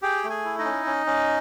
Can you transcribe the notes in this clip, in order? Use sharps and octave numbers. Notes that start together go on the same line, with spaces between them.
G4 G#4 G5
A3
G#4 G#5
E4
D#4 D#5
C#4
C#4
C#4